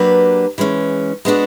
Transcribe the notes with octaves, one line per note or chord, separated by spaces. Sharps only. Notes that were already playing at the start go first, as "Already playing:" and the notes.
Already playing: F#3 A#3 D4 G4 B4
E3 G#3 C#4
G#3 B3 D4 F#4